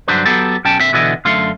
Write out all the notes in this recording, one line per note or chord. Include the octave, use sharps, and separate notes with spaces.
G2 D3 F#3 D4 B4 C5
F#3 B3 G4 A4
B1 C#4 G5 A5
A#2 D3 C4 E5
B2 D3 E3 B3 E4 D#5
F#2 D3 A3 F5 C6